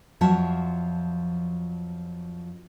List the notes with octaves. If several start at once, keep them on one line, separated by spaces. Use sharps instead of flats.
F2 F3 F#3 F4 E5 A5